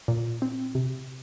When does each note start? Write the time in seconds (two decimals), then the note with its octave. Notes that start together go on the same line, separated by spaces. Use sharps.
0.08 A#2
0.42 C4
0.75 C3